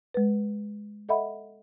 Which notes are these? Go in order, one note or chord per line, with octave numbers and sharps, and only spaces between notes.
G#3 B4
A4 D#5 E5 F#5 B5